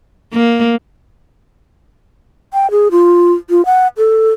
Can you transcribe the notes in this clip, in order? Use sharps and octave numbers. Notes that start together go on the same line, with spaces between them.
A#3
G5
G#4
F4
F4
F#5
A4